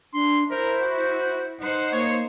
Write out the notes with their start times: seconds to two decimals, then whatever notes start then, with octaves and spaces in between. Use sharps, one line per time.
0.14 D4 C6
0.50 E4 A#4 C5
0.81 F#4
1.61 D#4 C5 F#5
1.92 A#3 C#5